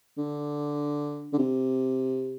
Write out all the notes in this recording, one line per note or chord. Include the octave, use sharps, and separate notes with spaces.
D3
D3
C3